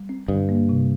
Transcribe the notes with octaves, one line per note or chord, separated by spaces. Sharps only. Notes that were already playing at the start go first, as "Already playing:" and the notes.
Already playing: G3
C4
G2 D3
A#3
C3